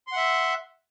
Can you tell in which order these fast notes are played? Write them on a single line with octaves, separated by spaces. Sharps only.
C6 F#5 E5